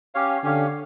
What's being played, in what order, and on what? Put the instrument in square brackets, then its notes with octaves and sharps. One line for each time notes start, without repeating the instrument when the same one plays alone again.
[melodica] C#4 G4 C#5 F5
[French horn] D3 [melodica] C#4 G4 C#5 F5